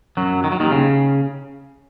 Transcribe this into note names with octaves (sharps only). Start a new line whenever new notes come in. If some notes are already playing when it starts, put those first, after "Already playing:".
F#2 F#3
D#3
F#3
D#2 D#3
C#3